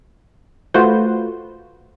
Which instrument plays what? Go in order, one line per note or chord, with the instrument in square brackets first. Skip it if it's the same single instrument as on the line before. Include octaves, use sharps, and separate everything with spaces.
[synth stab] A3 F4 F#4 B4 C5